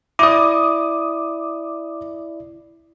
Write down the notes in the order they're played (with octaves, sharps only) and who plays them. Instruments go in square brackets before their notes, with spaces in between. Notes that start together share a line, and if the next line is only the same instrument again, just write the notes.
[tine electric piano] E4 D5 [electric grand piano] D6 D#6